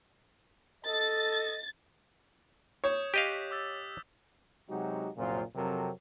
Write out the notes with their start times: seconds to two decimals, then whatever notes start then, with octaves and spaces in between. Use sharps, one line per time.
0.85 A4 D#5 A6
2.84 C#5 D#6 G6 E7
3.14 G4 D#5 F5 D6 F#6 B6
3.51 D6 E6 A6
4.69 C3 F#3 G#3 D#4 F#4 G4
5.17 C2 F#2 A#2 C#3 F4 C5
5.55 F2 C3 F#3 C4 A4 A#4